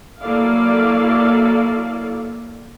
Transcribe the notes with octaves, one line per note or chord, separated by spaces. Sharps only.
F#3 A#3 E4 A4 D5 F5